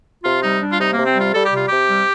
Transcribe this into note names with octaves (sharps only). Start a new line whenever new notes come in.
C3 F4
G3 D#4
G3 D4
F4
C3 D#4
C3 A#3
C4
G3
F4
G3 A4
G4
C3 F4
C3 G4
G3